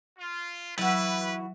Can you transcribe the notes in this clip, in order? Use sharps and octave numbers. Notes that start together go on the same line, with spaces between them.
F4
E3 F#3 E4 F#4 B4